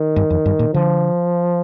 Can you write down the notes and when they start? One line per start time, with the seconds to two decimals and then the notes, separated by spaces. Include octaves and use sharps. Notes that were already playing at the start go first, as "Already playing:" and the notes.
Already playing: D#3
0.16 G2
0.30 F2
0.46 G2
0.59 A#2
0.74 D3 F3